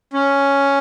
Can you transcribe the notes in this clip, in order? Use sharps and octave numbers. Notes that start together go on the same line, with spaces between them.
C#4